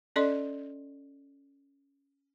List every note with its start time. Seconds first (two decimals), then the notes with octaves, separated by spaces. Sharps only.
0.16 C#4 A4 D5 D#5 C6